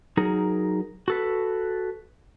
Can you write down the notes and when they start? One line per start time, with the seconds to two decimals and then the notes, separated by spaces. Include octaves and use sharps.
0.17 F#3 D#4 G#4 A#4
1.08 F#4 A4 B4